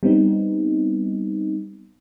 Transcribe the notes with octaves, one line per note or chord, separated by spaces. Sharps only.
G3 B3 C4 D#4